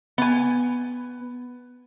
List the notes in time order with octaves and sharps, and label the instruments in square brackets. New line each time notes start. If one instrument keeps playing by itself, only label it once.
[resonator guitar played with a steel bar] B3 G#5